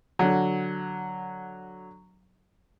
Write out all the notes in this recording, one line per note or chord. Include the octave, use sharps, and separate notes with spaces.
D3 F#3